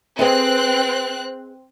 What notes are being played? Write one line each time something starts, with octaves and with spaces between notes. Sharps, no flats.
C4 G#4 B4 D#5 F#6